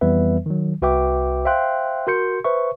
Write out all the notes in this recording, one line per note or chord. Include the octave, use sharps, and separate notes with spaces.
F2 E3 G3 B3 B4 E5
D#3 F#3
C2 F#4 B4 E5 G5 D6
C5 E5 F5 G5 C6 F#6
F#4 A#4 C6 G6 C#7
B4 C5 E5 C#6